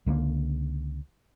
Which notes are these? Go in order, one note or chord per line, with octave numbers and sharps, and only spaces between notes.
C#2 D3 G3 A#3